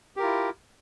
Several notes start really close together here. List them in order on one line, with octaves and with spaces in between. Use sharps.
G4 A#4 F4 E4